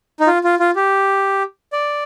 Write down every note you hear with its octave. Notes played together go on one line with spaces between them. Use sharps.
D#4
F4
F4
F4
G4
D5